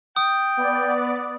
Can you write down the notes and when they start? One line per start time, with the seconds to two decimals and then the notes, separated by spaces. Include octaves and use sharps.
0.16 G5 D#6
0.57 B3 D5